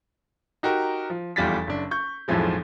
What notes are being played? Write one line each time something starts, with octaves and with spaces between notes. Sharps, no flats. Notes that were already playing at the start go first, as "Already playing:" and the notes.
D#4 F#4 G4 A#4
F3
F1 E2 G3 F4 A6 B6
F#1 D4
C#6 G6
B1 F2 A2 E3 F3 G#3